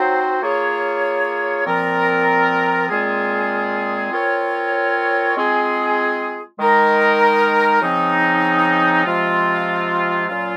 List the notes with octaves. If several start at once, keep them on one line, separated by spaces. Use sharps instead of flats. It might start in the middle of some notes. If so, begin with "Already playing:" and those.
Already playing: F#3 C4 D#4 F#4 C5
A#3 F4 G#4 C#5
A#2 F3 C4 F4 A#4
A#2 G#3 C4 F4 G#4
C4 F4 A#4 C#5
G#3 C4 F4 G#4
D#3 G#3 D#4 A#4 D#5
C#3 F3 C4 D#4
C3 F3 G#3 C4 F4
A#2 F#3 C#4 F4